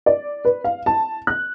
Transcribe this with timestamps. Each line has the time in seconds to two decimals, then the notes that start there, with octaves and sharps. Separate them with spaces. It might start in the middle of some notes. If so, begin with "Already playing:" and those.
0.06 D5
0.45 B4
0.64 F5
0.86 A5
1.27 F#6